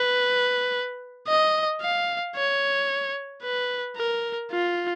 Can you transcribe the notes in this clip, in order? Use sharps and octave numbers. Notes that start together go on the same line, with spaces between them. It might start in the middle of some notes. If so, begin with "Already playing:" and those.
Already playing: B4
D#5
F5
C#5
B4
A#4
F4